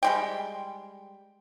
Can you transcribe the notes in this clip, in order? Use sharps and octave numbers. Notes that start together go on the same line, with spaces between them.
G3 G#3 G5